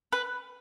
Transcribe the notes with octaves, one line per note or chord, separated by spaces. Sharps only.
B4